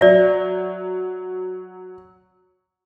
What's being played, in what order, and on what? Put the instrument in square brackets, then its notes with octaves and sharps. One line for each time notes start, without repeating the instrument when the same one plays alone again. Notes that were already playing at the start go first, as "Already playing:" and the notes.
[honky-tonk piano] F#3 [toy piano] D5 E5